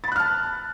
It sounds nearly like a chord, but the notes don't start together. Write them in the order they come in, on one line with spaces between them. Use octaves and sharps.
A6 B5 F#6 F6 A5